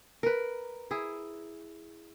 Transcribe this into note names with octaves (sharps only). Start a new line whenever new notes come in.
A#4 B4
E4 G#4